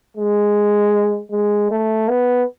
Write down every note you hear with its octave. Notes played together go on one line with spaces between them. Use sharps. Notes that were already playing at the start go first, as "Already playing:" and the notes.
G#3
G#3
A3
B3